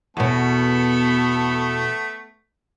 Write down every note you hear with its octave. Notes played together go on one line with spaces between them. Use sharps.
E2 B2 A3 B3 A4